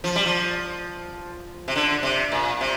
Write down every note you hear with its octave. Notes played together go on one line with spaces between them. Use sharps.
F3
G3
F3
C3
D3
C3
A#2
C3